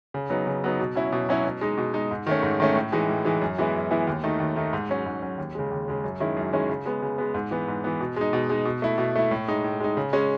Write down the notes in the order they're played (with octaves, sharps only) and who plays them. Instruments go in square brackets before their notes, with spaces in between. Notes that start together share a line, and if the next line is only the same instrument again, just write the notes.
[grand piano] C#3
F#3 B3 D#4
C#3
F#3 B3 D#4
B2
F#3 C#4 E4
B2
F#3 C#4 E4
B2
G#3 D#4
B2
G#3 D#4
G#2
D#3 A3 C#4
G#2
D#3 A3 C#4
A2
E3 G#3 D#4
A2
E3 G#3 D#4
F#2
E3 G#3 B3 E4
F#2
E3 G#3 B3 E4
D#2
D#3 A3 D#4
D#2
D#3 A3 D#4
G#2
F#3 C#4
G#2
F#3 C#4
D#2
C#3 G#3
D#2
C#3 G#3
F#2
D#3 G#3 C#4 E4
F#2
D#3 G#3 C#4 E4
C#3
G#3 B3
C#3
G#3 B3
G#2
E3 B3
G#2
E3 B3
B2
G#3 D#4
B2
G#3 D#4
B2
A3 E4
B2
A3 E4
A2
G#3 D#4
A2
G#3 D#4
C#3
G#3 C#4